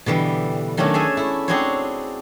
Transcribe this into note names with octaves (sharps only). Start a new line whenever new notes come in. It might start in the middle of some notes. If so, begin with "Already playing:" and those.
B2 D3 E3 G3
D#3 F#3 A3 C#4 D4
G#4 A4 E5 F#5 G#5
A3 E4
C4 D4 F#4 G#4 C5 C#5